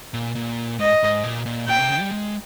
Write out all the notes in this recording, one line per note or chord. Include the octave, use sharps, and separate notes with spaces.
A#2
A#2
G#2 D#5
G#2
A#2
A#2
A#2 G5
C3
C#3
G3
G#3